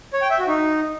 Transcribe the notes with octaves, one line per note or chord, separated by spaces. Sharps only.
C#5
G5
E5
F#4
D#4